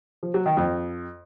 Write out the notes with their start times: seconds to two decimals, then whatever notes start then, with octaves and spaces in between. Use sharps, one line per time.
0.23 F3
0.34 F#3
0.46 D#3
0.57 F2